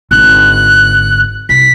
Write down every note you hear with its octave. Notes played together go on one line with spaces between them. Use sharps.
G#1 D3 F#6
C2 B6